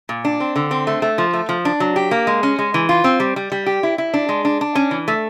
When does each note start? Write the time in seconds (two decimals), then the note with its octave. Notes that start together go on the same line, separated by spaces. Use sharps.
0.09 A#2
0.25 D4
0.40 C4
0.56 D3
0.71 C4
0.87 A3
1.02 A3
1.18 F3
1.33 A3
1.49 F3
1.65 D4
1.80 F#3
1.96 G4
2.11 A#3
2.27 G#3
2.43 C#4
2.59 G#3
2.74 E3
2.89 F4
3.04 C4
3.20 G3
3.36 G3
3.52 G3
3.66 G4
3.83 E4
3.98 E4
4.14 D4
4.29 G#3
4.45 D4
4.61 D4
4.75 C#4
4.91 E3
5.08 A3